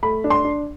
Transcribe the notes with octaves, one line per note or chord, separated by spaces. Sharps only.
A3 B5
D4
C6
D4